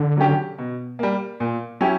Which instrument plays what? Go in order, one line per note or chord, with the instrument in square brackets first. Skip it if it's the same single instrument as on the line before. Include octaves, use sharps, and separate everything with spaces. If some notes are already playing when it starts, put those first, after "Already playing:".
Already playing: [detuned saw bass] D3
[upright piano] F#3 C#4 G4
B2
G3 A#3
A#2
F#3 C#4 E4 G4